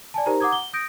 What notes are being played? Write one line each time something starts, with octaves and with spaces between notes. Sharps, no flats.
D5 G#5 A5
D#4 G4 A#4 C5 A#5
F#5 A#5 D6 D#6 G#6
G7
D#6 G6 A#6 D7